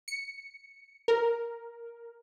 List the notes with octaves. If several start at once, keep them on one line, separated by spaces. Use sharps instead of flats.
C#7
A#4